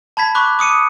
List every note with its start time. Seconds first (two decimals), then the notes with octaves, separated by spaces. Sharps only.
0.17 A5 B5 G#6 B6
0.35 B5 C#6 D6 F#6
0.59 D6 D#6 C#7 D#7